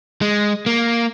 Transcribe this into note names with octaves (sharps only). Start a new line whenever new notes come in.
G#3
A#3